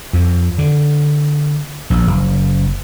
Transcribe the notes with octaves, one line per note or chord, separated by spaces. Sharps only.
F2
D3
A#1
F#1